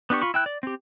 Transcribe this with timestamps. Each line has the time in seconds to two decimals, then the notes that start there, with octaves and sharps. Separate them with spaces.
0.10 B3 D4 G4 C#6
0.22 F4 B5 C#6
0.34 E4 G5 F#6
0.46 D5
0.63 C4 G4